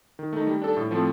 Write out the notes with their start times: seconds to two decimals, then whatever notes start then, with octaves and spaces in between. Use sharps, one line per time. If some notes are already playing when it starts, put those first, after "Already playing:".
0.19 D#3
0.33 A3 D#4
0.47 G3
0.62 D4 A4
0.77 A2
0.91 F3 A3 C4